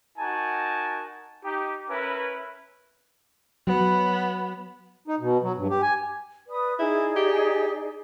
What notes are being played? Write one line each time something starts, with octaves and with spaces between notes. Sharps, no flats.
D#4 F#4 A#4 G#5 A5
D#4 G4
C#4 E4 A#4 B4
F#3 B3
D#4
B2
F#3
G2
G4
G#5
B4 D5 D#6
D#4 E4 G#4 D5
G4